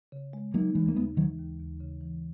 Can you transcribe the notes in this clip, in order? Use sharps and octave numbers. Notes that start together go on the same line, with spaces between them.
C#3
G#3
F#3 A#3 D#4
D#2 E3 G#3
A#3
C#3 G#3 B3
D#3 E3 F#3
D#2
D#2
C#3
E3